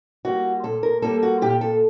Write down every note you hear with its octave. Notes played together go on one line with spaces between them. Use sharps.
G3 A#3 F#4
A#2 A4
A#4
G3 A#3 A4
F#4
A#2 G4
A4